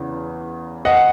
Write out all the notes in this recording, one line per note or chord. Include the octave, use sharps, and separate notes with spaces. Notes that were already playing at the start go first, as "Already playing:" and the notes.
Already playing: E2 C#3 E3
D#5 F#5